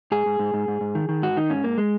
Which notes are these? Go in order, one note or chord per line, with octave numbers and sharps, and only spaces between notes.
G#2 G#4
G#2
G#2
G#2
G#2
G#2
D#3
D#3
G#2 F#4
D#3 D#4
G#2 C#4
G#2 A#3
G#3